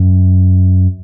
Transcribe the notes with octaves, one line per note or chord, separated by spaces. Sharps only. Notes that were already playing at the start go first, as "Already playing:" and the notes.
Already playing: F#2